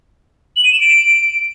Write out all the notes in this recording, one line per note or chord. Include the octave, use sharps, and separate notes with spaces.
F#7
D#7
E7
D7